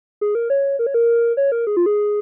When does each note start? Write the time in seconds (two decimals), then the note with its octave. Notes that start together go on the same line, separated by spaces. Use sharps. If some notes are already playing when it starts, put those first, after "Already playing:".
0.21 G#4
0.35 A#4
0.50 C#5
0.79 A#4
0.86 C#5
0.94 A#4
1.37 C#5
1.52 A#4
1.67 G#4
1.77 F4
1.86 G#4